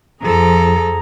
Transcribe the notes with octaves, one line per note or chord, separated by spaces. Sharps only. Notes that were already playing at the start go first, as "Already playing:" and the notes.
F2 F3 G#4 A4 A#5